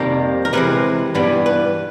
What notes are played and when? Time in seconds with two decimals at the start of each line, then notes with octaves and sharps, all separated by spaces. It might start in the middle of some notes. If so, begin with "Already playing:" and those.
Already playing: F2 C3 D#3 G3 A#3 G4
0.45 A#4
0.53 C3 E3 G#3 C4 B4
1.15 G2 E3 G3 B3 D4
1.46 B4